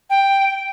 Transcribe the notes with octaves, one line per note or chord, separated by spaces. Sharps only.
G5